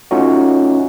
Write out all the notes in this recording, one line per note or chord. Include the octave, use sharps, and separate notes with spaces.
A3 C#4 D#4 F4 F#4